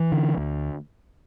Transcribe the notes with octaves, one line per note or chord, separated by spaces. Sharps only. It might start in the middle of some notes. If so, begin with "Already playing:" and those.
Already playing: E3
D3
D2